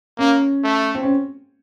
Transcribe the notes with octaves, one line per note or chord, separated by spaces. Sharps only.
A#3 C#4
A3
C4
C#4